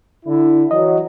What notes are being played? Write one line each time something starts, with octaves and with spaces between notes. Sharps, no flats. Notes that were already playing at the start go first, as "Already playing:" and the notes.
D3 E4
E3 F#3 D#5